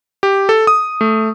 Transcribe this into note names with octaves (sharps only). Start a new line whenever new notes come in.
G4
A4
D#6
A3